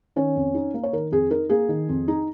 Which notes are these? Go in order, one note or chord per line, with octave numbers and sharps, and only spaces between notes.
D#3 C#4 C#5
F2
D#4
A#3
C#5
D#3 A#4
F2 G#4
D#4 A#4
A#3 G#4
D#3
F2
D#4